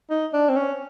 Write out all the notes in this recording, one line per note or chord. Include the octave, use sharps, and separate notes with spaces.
D#4
D4
C4
C#4